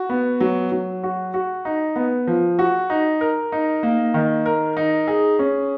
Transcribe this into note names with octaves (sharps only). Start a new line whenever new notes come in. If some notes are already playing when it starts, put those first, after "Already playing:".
Already playing: F#4
B3
F#3
F#3
F#4
F#4
D#4
B3
F3
F#4
D#4
A#4
D#4
A#3
D#3
A#4
D#4
G#4
C#4